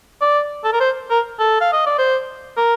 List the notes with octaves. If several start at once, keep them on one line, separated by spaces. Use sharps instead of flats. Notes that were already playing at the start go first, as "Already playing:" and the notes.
D5
A4
A#4
C5
A#4
A4
F5
D#5
D5
C5
A#4